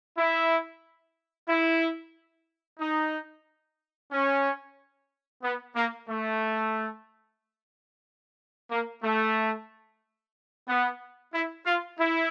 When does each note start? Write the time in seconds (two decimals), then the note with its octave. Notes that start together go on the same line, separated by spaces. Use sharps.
0.18 E4
1.49 E4
2.80 D#4
4.12 C#4
5.43 B3
5.76 A#3
6.09 A3
8.71 A#3
9.04 A3
10.68 B3
11.34 E4
11.67 F4
12.00 E4